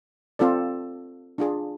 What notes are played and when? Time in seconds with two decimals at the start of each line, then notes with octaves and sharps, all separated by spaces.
0.39 C4 F4 A4 D5
1.38 D4 F4 G#4